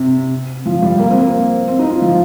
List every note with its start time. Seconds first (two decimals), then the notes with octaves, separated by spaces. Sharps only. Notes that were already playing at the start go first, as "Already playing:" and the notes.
Already playing: C3
0.66 F3
0.82 G3
0.99 A#3
1.10 C4
1.21 A#3
1.68 C4
1.79 D#4
1.90 F4
2.02 F3